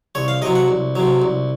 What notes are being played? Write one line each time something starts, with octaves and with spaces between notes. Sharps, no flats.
C2 C#5
F5
C3 F#3 D#5
F#5
C2
C3 F#3
C2